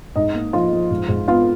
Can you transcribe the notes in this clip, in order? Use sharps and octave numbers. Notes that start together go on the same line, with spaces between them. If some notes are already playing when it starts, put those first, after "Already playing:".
G#2 D#4 D#5
A#3
F3 F4 F5
F3
G#2
G#2
B3 F4 F5